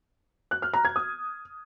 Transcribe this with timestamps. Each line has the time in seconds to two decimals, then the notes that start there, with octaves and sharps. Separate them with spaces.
0.51 F#6
0.62 F6
0.73 A#5
0.85 G#6
0.96 D#6